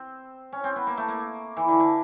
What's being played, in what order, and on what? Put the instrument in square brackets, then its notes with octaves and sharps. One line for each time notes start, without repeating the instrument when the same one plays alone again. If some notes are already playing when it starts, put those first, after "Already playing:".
Already playing: [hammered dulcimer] C4
C#4
C4
B3
A#3
A3
A#3
E3
D3
D3